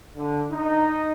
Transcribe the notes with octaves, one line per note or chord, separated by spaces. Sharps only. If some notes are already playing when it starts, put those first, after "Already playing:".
D3
D#4